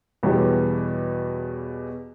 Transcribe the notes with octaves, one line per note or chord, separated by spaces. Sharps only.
E2 B2 E3 G3 C#5